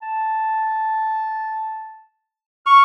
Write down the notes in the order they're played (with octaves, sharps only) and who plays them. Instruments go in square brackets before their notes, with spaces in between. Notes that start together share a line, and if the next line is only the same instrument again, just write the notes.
[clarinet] A5
[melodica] C#6 [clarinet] F6